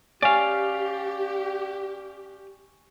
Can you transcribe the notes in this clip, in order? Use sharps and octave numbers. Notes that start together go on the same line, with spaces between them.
C#4 G4 D5 F5 G#5 C#6